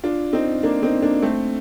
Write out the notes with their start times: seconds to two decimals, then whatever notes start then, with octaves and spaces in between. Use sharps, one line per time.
0.04 D4 F4
0.33 C4 D#4
0.63 A#3 D4
0.83 C4 D#4
1.02 A#3 D4
1.22 A3 C4